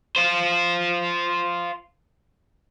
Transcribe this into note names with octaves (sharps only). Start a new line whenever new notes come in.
F4 C5